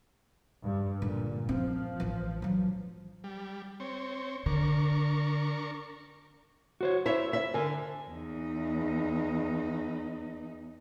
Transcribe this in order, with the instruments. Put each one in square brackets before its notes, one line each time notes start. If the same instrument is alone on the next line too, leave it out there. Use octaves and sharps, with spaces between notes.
[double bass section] G2
[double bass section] A#2 [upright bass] D3
[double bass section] F3 [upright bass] C4
[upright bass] A1 E3
E3 F#3
[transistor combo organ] G3
C4 C#5
[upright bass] D3 [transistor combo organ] D4 A#4 C#6
[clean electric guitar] F#4 C5 C#5
[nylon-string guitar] E4 C#5 E5 [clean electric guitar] C5
[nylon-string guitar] E5
[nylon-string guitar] D3 [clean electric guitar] A#4 G#5
[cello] E2 D#4